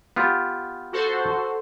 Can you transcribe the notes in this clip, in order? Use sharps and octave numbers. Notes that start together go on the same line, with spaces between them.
B3 F4 G4
F#4 A4 C5